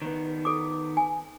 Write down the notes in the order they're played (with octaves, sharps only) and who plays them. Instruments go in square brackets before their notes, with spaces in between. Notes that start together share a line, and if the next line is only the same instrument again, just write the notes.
[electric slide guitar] D#3 B3
[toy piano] A4 D6
G#5